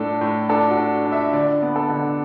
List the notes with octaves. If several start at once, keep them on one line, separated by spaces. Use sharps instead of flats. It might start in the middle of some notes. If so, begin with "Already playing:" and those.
Already playing: A2 D4 A4
A2
D4 A4
F#4
D4
D4
E5
D3 D5
B3
A4
D3